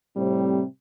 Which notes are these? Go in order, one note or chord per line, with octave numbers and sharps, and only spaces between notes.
A2 C3 G3 C4